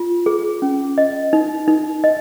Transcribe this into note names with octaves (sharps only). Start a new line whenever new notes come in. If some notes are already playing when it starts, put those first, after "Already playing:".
Already playing: F4
G#4
C#4
D#5
D#4
D#4
D#5